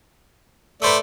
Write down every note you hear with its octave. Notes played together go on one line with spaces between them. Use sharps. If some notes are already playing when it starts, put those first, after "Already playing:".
A3 B4 C5 D5 D#6